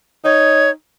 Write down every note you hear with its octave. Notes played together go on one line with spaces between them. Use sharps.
D#4 C#5